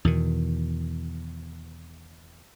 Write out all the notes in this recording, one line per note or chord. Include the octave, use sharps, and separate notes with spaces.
E2 B2 D#3